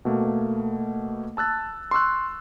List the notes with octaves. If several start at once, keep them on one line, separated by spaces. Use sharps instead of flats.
B2 A3 A#3
A5 E6 F#6 A6
C6 C#6 E6 F#6